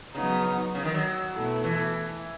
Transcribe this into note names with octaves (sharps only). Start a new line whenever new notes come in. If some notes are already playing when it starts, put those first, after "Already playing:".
C#3 F#3 B3 D#4
C#3
D#3
F#3
B2 A3 E4
E3